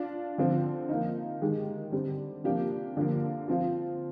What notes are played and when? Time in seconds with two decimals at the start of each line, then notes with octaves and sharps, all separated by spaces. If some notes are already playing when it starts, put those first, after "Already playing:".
Already playing: D4 F4
0.38 D3 F3 C4
0.89 F3 A#3 D#4
1.41 D#3 G#3 D#4 G4
1.92 D3 G3 C4
2.44 C3 F3 A#3 D4 G4
2.97 D3 F3 A#3
3.48 F3 C4 F4